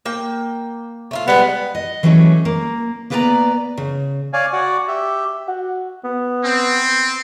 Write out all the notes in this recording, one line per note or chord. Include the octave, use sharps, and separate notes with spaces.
A#3 G5
A3 E4 F4
G3 G#3 B3
D#5
E3 F#3 G3 A3 C#4
A#3
A#3 B3 B4 D5 E5 A#5
C#3
C#5 D5 F5 G#5
F#4 D5 F#5
G4 E5
F#4
B3
C4